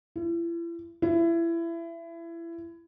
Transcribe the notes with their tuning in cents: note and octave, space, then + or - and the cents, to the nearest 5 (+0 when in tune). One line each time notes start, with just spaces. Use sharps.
E4 +40
E4 +25